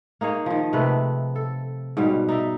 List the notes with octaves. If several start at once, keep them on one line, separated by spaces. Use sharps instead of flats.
A#3 D#4 G#4 C#5
D#3 F3
C3 G#3 A3 B4
A4
G#2 B2 G3 F5
D#4 D5 E5